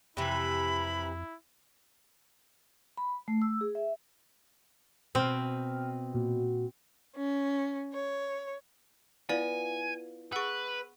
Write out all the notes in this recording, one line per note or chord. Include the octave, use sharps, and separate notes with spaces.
F2 C3 E3 E4 B5
B5
A3
E6
G#4
E5
B2 C4 G5 F6
A#2 F#4
C#4
C#5
B3 E4 F4 D5 F5 G#5
G#4 B4 F#5 C#6 E6